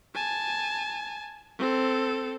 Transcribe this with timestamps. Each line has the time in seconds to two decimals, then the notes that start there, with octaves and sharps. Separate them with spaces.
0.14 G#5 A5
1.59 C4 A4